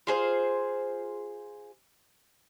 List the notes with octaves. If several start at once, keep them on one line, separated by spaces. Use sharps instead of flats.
F4 G#4 C5